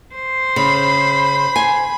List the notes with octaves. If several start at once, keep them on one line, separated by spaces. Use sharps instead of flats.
C5
C#3 B5
G#5